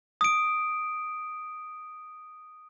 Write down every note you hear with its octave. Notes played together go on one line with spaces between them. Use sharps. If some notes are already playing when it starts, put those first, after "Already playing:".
D#6 D7